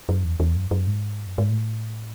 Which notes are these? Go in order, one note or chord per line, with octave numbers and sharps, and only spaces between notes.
F#2
E2
E2
F#2
F#2
G#2
F#2
G#2
A2